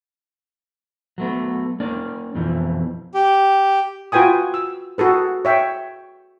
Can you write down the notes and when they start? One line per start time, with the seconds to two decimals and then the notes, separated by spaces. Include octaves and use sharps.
1.18 F#3 A3 B3
1.80 A#3 C#4 D5
2.35 F2 B2 E3 F3
3.14 G4
4.12 F4 F#4 B4 G5 G#5 D#6
4.54 E6
4.98 F#4 G#4 A4 B4
5.45 C#5 E5 G5